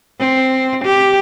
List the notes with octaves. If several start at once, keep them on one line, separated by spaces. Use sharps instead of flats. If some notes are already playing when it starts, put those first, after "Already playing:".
C4
G4